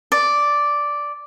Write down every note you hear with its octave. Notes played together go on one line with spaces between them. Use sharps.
D5